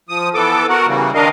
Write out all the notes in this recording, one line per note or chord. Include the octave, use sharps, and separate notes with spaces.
F3 D#6
E3 B3 A4 D6
F#4 A#4 F#5
C#3 E3 G3 A#3
D#3 D4 A#4 D#5 F5